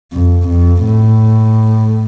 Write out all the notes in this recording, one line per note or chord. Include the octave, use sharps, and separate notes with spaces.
F2
F2
A2